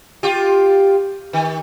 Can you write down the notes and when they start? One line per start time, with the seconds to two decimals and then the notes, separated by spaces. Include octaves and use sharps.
0.23 F4 G4
1.33 D#3